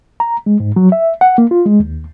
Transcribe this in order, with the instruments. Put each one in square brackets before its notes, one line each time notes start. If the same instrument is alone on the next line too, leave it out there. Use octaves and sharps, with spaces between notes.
[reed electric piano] A#5
G#3
G#2
F#3
E5
F#5
A#3
F4
G#3
D#2